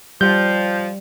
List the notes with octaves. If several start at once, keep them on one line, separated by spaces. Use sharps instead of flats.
F3 G3 G6